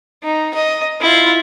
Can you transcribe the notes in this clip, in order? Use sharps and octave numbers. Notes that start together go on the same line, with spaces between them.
D#4
D#5
E4 F4